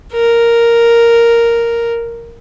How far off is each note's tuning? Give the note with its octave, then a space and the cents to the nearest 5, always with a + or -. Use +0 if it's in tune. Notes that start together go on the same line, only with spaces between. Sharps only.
A#4 +0